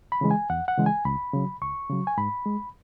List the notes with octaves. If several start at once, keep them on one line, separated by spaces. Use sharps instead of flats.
B5
C#3 E3 G#3
G#5
E2 F#5
F#5
C#3 E3 G#3
G#5
C#2 B5
C#3 F#3
C#2 C#6
C#3 F#3
G#5
G#2 B5
G#3